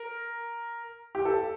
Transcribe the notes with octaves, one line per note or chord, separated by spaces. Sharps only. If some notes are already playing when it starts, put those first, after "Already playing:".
Already playing: A#4
G4
A4